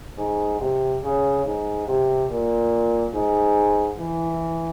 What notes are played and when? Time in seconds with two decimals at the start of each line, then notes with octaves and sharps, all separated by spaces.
0.18 G#2
0.60 C3
1.03 C#3
1.44 G#2
1.87 C3
2.30 A#2
3.14 G#2
3.99 E3